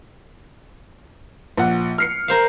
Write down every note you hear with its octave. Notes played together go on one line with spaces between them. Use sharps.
A#1 F#5
F6 C7 C#7
A#4 C5 F5